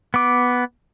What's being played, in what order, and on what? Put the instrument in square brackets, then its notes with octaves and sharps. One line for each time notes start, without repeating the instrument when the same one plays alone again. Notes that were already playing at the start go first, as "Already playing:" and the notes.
[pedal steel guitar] B3 D6